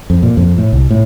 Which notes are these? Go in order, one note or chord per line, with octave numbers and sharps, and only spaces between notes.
F2
A#2
F2
A2
C2
A2